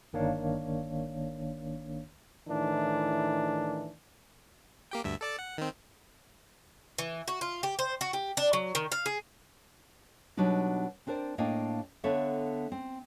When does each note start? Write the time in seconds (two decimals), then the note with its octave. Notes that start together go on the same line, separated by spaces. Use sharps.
0.13 G1 D#3 A#3 D4 C#5 F5
2.48 A2 D#3 E3 D4
4.91 A#3 G4 G5
5.04 D2 G2 E5
5.21 A4 D5 A5
5.39 F#5
5.58 D#3 C4
6.98 E3
7.28 F#4
7.41 F4
7.63 G4
7.79 C5
8.01 F#4
8.13 G4
8.37 D4
8.53 F#3
8.75 D#3
8.92 F5
9.06 G#4
10.37 B2 F#3 G3 D4 D#4
11.07 C4 D4 A#4 C5 D5
11.38 A2 A#3 D4 D#5 F5 G5
12.03 D3 B3 A4 C#5 E5 F5
12.72 C4